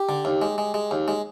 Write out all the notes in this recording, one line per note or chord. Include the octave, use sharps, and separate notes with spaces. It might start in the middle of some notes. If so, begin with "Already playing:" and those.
Already playing: G4
D3
D#2
G#3
G#3
G#3
D#2
G#3